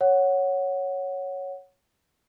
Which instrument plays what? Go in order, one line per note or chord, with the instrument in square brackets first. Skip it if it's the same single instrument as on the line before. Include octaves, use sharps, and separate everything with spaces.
[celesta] C#5 F#5